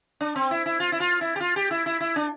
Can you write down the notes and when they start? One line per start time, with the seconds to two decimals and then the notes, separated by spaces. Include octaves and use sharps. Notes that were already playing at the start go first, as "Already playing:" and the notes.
0.21 D4
0.36 C4
0.51 E4
0.66 E4
0.80 F4
0.92 E4
1.00 F4
1.21 E4
1.36 G4
1.40 F4
1.56 G4
1.71 E4
1.86 E4
2.00 E4
2.16 D4